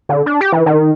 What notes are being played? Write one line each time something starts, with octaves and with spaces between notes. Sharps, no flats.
D3
D4
G4
E3
D#3